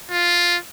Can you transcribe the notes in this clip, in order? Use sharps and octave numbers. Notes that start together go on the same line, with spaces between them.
F4